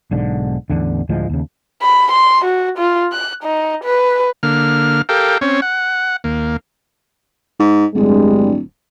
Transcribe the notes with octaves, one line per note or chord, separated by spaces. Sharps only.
B1 G#2 D3
A1 E2 D3
D2 A2 F3 G#3
D#2 C#3
B5
C6
F#4
F4
F#6
D#4
B4
D3 A#3 F6
G4 A4 A#4 F5 G5
C4 C#4 C#5
F#5
D#2 A#3
G#2
D1 G2 G3 G#3